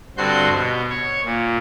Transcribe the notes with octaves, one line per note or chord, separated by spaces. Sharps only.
G2 D3 C4 F#4 C6 G6
B2
C#5
A#2